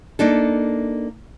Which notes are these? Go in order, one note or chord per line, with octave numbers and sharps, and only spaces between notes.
A#3 D4 D#4 A4